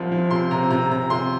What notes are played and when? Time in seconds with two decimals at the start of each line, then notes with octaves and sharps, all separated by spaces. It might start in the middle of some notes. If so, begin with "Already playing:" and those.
Already playing: C2 F3
0.12 F3
0.30 C3 C6
0.51 C3 A#5
0.71 C3 A#5
0.91 C3 A#5
1.10 C3 C6